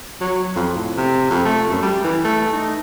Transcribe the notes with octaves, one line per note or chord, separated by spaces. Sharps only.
F#3
F2
A2
C3
F2
A3
F#2
G3
E3
A3
D#4